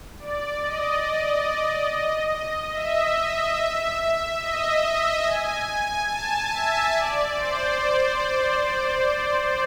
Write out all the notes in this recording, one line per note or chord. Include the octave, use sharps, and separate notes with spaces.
D5
D#5
E5
D#5
E5
G#5
A5
E5
D5
C5